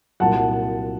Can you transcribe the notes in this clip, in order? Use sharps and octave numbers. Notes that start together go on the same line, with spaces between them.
C2 A#2 F#3 F#5 A5